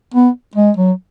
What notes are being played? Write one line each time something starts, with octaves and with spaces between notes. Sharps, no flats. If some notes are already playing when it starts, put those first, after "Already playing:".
B3
G#3
F#3